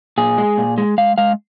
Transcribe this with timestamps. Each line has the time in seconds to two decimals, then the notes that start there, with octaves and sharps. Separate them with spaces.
0.18 A#2 G#4
0.38 G#3
0.58 A#2
0.78 G#3
0.98 G#3 F5
1.18 G#3 F5